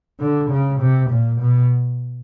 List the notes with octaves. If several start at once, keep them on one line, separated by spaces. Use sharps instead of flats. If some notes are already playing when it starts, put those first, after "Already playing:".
D3
C#3
C3
A#2
B2